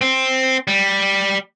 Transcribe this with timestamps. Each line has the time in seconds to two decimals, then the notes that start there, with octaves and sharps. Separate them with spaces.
0.01 C4
0.68 G3